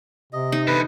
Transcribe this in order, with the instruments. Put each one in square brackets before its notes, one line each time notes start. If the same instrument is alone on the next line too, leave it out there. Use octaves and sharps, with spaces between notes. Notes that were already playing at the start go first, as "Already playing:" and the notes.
[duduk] C3 [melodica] D#5
[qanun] D#4
[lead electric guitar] E2 D3 [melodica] B4